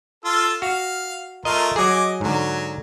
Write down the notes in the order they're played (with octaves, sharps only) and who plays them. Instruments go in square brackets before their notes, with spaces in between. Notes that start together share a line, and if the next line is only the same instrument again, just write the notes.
[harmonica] F4 A4 E6
[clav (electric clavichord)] F#4 [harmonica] F5
[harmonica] A3 F4 A#4 [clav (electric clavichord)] D#5
[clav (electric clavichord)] F#3 G#4 [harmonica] D#5 G#5 D6
[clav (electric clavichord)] G#2 D3 [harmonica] F#3